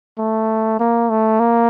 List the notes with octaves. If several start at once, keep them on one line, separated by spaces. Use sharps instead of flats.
A3
A#3
A3
A#3